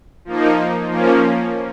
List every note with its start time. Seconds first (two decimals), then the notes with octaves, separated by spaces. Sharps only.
0.25 F3 A#3 D#4
0.88 F3 A#3 C#4